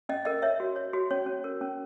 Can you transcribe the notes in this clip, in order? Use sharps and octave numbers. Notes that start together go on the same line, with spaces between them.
C#4 D#5
A#4 D#5
C#5 E5
F#4
C#5
F#4
C#4 C#5
C#4
A#4
C#4